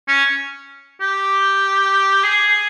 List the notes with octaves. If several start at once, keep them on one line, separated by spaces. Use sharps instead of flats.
C#4
G4
G#4